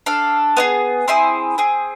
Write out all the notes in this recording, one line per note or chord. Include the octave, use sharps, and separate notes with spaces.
D4 A4 F5
B3 E4 G#4
C4 E4 G#4 C6
C4 G#4